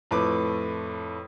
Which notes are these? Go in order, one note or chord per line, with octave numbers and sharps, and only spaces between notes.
F2 A2 A3 B4 D6